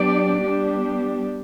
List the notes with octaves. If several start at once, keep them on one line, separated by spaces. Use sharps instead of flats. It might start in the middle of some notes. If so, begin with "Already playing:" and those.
Already playing: F#3 B3 D4 G4 D5
G3 B3 D4 G4